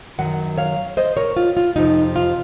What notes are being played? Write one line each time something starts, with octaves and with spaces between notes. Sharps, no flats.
F#2 D#3 F#3 F#5
C#5 F5
C5 D#5
A#4 C#5
F4
F4
F2 C3 F3 C4 D#4
F4